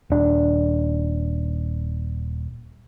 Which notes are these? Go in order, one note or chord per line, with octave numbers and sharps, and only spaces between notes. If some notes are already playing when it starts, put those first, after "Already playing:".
D#1 D4